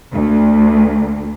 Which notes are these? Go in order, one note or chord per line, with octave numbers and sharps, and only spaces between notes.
D2